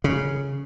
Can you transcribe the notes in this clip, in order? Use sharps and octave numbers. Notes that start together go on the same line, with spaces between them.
C#3